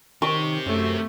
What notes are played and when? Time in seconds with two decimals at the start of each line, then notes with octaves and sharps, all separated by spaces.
0.22 D#3 C4 G4 C#6
0.66 F#2 A3